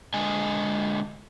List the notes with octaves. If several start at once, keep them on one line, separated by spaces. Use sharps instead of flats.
D3 G#3 D#5 G#5